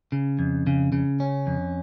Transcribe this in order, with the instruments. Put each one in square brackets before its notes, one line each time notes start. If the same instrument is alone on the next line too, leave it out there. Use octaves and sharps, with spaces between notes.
[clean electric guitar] C#3
F2
C#3
C#3
C#4
F2